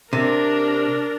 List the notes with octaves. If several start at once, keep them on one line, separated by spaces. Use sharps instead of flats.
C3 D4 A#4